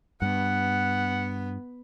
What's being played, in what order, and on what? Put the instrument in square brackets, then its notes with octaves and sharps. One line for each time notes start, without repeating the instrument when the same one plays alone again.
[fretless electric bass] G2 [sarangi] B3 [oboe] F#5